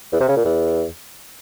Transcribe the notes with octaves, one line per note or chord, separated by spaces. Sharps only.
E2
C3
C#3
A#2
E2